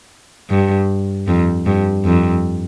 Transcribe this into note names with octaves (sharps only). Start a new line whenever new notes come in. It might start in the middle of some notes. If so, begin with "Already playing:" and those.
G2
F2
G2
F2